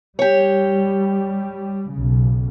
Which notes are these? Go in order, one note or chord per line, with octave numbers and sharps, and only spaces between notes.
G3 G4 C#5
B1 C#3